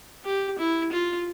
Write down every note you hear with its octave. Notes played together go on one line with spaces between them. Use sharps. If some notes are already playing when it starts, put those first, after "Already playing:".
G4
E4
F4